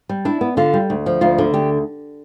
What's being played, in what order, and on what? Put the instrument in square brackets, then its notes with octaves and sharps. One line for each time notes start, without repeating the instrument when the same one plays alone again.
[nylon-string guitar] G3
D4 E4
B3
D3 F4
G3
D2
F3
D2 F4
D3
D2 G4